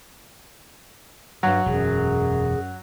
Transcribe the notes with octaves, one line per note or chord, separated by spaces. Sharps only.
G2 F#3
E1 F#2 G#4